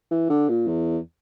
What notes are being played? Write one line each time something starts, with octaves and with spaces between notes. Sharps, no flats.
E3
D3
A#2
E2